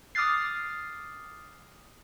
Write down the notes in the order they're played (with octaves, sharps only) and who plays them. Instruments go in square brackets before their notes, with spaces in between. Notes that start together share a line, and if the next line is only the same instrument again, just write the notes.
[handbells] D6 D#6 F6 F#6 A6 C7